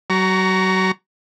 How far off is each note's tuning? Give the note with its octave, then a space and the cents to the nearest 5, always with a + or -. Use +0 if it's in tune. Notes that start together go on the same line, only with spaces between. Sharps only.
F#3 +30 A#5 -5 C#6 +20